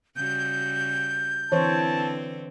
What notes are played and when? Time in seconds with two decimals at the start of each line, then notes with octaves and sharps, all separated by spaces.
0.16 C#3 G3 F#4 G6
1.52 D3 E3 C4 C5 C#5 A5